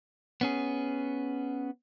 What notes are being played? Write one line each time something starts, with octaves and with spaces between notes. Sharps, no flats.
B3 C#4 G#4